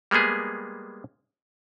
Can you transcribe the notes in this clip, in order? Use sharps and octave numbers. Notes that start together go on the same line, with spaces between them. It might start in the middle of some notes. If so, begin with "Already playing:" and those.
G3 G#3 A#3 B3 G#4